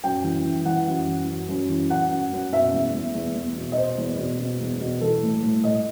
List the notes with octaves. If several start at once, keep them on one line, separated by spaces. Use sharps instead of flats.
F#2 G5
E3
E3
E3 F#5
F#2
E3
F#2
F#2
E3
F#2 F#5
F#2
F#2
B2 E5
E2
E2
E2
E2
B2
D#5
B2 C5
E2
B2
B2
E2
B2
E3 A4
A2
A2
A2 D#5